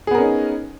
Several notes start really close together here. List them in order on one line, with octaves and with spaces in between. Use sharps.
G#4 B3 A#4 C#4 D#4